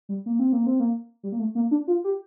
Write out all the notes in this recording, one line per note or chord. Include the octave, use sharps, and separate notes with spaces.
G3
A#3
C4
A#3
C4
A#3
G3
A#3
A3
A#3
D4
F4
G4